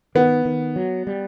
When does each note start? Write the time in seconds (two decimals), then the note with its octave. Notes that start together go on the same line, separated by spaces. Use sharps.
0.15 D#3 B3
0.45 D#3
0.76 F#3
1.07 G3